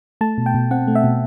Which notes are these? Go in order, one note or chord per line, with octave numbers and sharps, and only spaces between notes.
A3 A5
B2
G5
B2
C4 F#5
A3
E5
B2